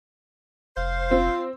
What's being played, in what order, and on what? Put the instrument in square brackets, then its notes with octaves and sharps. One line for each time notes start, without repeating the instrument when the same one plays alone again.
[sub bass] F1 [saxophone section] C5 F5
[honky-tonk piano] C4 [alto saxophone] F4